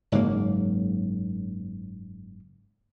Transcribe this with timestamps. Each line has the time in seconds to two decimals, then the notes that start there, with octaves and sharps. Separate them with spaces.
0.12 F#1 G#2 F#3 A#3